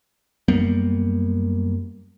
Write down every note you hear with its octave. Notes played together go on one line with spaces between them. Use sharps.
F#2 G3 A#3 B3